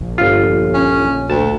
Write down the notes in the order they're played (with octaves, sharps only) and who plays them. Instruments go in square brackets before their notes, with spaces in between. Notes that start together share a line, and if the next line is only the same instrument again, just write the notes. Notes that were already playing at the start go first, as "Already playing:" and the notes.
[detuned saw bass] A#1
[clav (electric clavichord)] G1 F4
[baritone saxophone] C#4
[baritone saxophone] D2 [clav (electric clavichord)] A5